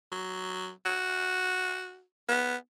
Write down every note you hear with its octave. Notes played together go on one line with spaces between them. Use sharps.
F#3
F#4
B3